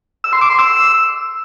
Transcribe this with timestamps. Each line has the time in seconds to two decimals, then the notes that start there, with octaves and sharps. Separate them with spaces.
0.24 E6
0.33 C6
0.41 D6
0.50 C6
0.59 E6